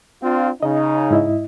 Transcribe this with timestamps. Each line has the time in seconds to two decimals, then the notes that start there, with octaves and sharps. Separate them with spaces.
0.23 C4 D4 F4
0.63 C#3 D#4 D#5
1.11 G#2 E4 D#5